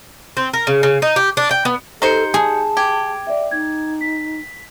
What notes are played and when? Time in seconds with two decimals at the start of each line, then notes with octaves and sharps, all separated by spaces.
0.37 C4
0.53 A#4
0.67 C#3
0.83 C#3
1.02 D#4
1.16 G4
1.37 D4
1.51 G5
1.65 B3
2.02 D#4 G4 A4 C5 G6 C#7
2.34 G#4 A5
2.77 G4 G#6
3.27 D5 E5
3.51 D#4 G#6
4.01 B6